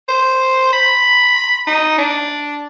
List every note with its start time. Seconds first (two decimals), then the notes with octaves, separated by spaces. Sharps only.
0.08 C5
0.73 B5
1.67 D#4
1.98 D4